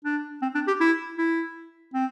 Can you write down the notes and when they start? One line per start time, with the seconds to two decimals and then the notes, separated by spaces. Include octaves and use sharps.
0.05 D4
0.42 C4
0.55 D4
0.68 G4
0.80 E4
1.18 E4
1.94 C4